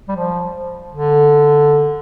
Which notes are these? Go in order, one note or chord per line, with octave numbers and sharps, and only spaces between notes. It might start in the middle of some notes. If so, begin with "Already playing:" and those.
G3
F3
D3